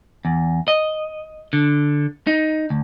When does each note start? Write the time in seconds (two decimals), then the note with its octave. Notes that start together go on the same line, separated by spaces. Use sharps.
0.25 E2
0.68 D#5
1.53 D3
2.27 D#4
2.70 D2